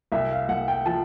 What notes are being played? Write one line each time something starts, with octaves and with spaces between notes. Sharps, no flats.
C2 E5
F5
C2 F#5
G5
F3 A5